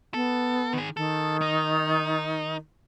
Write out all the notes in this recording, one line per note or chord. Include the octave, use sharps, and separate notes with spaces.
B3 A4
D#3 G#4
D#3 A4
D#4